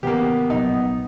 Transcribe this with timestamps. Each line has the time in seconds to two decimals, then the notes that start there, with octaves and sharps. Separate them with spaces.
0.03 A1 C#3 E3 A#3 B3 G4
0.50 A#1 C3 F#3 D#4